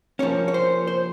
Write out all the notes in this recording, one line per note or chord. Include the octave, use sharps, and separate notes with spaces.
F3 A#3 C#4 C#5
C#5
C5
C5